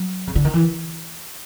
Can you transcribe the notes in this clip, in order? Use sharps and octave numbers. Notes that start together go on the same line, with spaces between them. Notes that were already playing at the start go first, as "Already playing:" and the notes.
Already playing: F#3
C#3
D3
D#3
E3